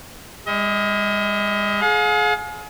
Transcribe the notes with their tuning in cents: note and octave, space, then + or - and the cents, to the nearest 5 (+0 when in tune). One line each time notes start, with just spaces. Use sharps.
G#3 -40 D#5 +35
G#4 +30 F5 +40